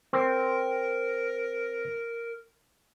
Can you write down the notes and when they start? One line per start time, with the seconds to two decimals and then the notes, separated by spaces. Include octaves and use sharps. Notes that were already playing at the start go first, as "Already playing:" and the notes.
0.13 C4 A#4